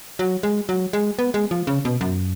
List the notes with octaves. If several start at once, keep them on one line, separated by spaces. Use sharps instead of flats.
F#3
G#3
F#3
G#3
B3
G#3
F3
C#3
B2
F#2